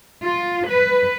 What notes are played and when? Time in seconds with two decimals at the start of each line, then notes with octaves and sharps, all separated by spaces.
0.23 F4
0.69 B4